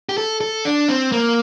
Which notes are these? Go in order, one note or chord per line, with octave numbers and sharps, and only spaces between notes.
G4
A4
A4
D4
C4
A#3